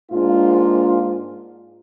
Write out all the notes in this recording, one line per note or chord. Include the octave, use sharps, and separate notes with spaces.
G#2 A#3 D4 F4